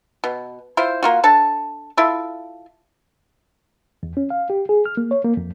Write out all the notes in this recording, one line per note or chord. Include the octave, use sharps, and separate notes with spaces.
B2
E4 F4 C5
A#3 F4 F#4
D4 A4 A5
E4 F4 A4
E2
C#4
F5
G4
G#4
F6
A#3
C#5
A#3
F2